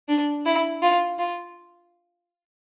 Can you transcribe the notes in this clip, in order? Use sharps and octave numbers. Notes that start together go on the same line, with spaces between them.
D4
E4
F4
F4